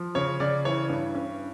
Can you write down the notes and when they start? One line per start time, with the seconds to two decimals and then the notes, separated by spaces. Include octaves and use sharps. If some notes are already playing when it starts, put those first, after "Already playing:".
Already playing: F3
0.15 C#3 C#5
0.40 C#3 D5
0.65 E3 C#5
0.90 G2
1.15 C#4